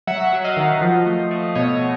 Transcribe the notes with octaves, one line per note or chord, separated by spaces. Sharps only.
F#3 E5 F#5
F#3
D#5 F5
D#3
F3
A3
A3
B2 C#5 D#5